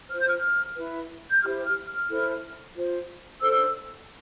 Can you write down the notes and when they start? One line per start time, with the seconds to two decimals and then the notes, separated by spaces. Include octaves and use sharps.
0.10 F4 C5 F6
0.19 G6
0.27 F6
0.76 E4 B4
1.30 G6
1.43 E4 G4 C5 F6
1.64 F6
1.87 F6
2.10 E4 A4 C5
2.75 F4 C5
3.42 D4 A4 C5 E6